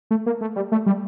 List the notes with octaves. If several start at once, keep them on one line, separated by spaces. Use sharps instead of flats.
A3
A#3
A3
G3
A3
G3